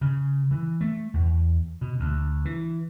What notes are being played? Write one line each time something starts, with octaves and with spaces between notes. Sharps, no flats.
C#3
E3
A3
E2
B2
D2
E3